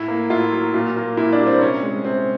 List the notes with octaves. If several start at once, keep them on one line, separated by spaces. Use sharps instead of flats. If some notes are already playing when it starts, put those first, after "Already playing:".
Already playing: A2 E4
A#3
A2 F4
F#3
A#2
A#3
A#2 E4
D4
G3
C4
C3 C#4
G#3
C3 C4